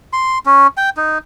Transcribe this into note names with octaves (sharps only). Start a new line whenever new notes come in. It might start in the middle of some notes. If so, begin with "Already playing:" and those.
C6
C#4
G5
D#4